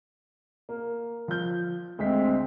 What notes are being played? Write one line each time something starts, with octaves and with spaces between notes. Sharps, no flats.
A#3
F3 G6
D2 G#3 C4 B6